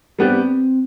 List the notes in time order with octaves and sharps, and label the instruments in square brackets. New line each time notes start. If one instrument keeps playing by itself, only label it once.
[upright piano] G3 B3 D4 G4 [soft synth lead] C4